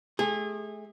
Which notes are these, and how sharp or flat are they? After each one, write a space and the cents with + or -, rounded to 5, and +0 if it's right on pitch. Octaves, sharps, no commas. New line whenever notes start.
A3 -40 G#4 -30